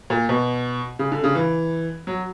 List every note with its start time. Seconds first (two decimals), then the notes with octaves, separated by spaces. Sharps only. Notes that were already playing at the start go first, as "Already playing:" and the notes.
0.10 A#2
0.29 B2
0.99 C#3
1.12 D3
1.24 C#3
1.35 E3
2.07 F#3